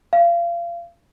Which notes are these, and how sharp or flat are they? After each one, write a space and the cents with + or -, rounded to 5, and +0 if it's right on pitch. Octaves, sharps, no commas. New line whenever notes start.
F5 -30